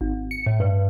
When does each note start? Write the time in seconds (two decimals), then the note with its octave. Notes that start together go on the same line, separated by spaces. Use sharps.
0.01 G#1
0.14 G#1
0.31 C#7
0.46 A2
0.60 G2